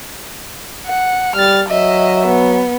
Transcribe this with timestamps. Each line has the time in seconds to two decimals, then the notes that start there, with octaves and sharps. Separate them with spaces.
0.86 F#5
1.36 G3 F6 A6
1.69 F#3 D#5 E5
2.27 B3